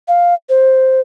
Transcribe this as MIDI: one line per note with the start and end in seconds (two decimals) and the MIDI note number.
0.08 0.34 77
0.49 1.00 72